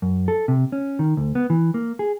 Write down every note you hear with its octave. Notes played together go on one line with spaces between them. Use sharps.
F#2
A4
C3
C#4
D#3
D2
B3
E3
A#3
G#4